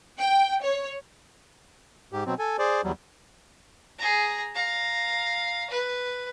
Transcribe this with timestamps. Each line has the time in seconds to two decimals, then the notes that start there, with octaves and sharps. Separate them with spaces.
0.18 G5
0.62 C#5
2.12 G#2 G4
2.26 B2 F#3 C4
2.39 A4 G#5
2.59 G#4 C5 D5
2.84 E2 F#3 G3
3.99 G#4 A#5
4.55 F5 A#5
5.70 B4